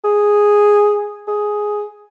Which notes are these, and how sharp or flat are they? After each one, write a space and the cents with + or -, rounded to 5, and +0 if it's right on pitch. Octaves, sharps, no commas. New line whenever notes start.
G#4 -5
G#4 +5